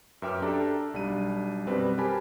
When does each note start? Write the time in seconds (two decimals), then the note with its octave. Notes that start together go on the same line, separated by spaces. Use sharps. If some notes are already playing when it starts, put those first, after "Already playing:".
0.22 F#2 B4 E5 G5 D6 F6
0.42 D4 G4 A4 E5 A#5
0.94 B1 G3 D4 D#7
1.66 F#2 B2 G3 C4 B4 F#6
1.98 G4 A#4 C5 G#5 A5 B5